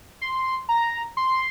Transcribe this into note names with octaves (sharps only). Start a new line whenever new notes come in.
C6
A#5
C6